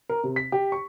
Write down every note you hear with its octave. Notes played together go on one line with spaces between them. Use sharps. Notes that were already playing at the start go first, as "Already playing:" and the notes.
A#4
C3
B6
G4
C#6